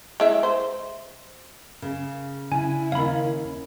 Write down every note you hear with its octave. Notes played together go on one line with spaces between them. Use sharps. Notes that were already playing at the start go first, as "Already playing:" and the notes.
G#3 E4 E5
C5
C#3
C#3 D4 E4 G#5
D#2 C#4 F5 B5